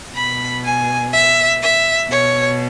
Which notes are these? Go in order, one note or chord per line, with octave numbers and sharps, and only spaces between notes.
B2 B5
G#5
E5
E5
B2 C#5